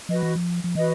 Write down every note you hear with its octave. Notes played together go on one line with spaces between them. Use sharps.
F3 F#4 B4 D#5
E3
F3
F3
E3 F#4 B4 D#5